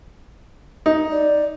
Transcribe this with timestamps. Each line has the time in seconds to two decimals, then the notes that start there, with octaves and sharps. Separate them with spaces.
0.86 D#4
1.12 D5